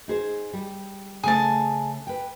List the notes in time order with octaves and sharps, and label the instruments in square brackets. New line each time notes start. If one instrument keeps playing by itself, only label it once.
[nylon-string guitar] D#4 G#4 C5
G3
[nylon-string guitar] C#3 A3 [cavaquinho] G#4 A5
[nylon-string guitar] B4 G5